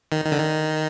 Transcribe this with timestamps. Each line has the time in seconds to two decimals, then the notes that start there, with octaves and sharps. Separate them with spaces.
0.12 D#3
0.24 D#3
0.32 D3
0.38 D#3